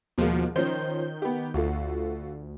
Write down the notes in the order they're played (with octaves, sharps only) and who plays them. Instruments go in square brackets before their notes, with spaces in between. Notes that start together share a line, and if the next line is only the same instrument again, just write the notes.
[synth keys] D#2 F3 [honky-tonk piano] B2 G#3 A#3
[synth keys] D#3 G6 [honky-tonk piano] F3 C#4 C5
[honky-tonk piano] B3 G4
[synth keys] D2 [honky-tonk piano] A3 F4 F#4